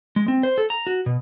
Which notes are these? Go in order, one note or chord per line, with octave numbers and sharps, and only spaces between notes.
G#3
C4
C5
A4
A#5
F#4
B2